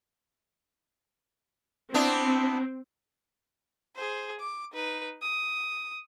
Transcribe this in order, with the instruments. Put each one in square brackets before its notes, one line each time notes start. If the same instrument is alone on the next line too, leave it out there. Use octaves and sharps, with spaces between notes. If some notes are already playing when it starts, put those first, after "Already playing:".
[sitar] B3 D4 E4 [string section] C4
[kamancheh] G#4 C5
D6
D#4 B4
D#6